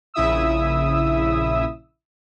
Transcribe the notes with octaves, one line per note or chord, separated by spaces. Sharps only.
A#1 C#3 E4 E5 D#6 E6